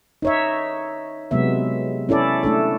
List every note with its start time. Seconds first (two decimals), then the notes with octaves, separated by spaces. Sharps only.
0.22 D#4 C#5 E5
1.31 C3 F#3 G#3 B3 E5
2.09 C#4 E4 A4 D5
2.43 A3 D4 A4